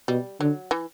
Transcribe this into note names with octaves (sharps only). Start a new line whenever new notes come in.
B2 G3
D3 F#3
E3